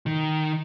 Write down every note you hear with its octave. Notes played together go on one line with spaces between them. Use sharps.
D#3